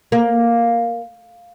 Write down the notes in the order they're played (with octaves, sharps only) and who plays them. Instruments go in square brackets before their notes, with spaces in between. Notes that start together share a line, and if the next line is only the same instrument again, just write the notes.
[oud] A#3